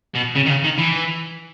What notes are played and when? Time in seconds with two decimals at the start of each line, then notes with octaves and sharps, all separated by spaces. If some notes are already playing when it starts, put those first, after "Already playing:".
0.15 B2
0.36 C#3
0.46 D#3
0.50 C#3
0.64 D#3
0.78 E3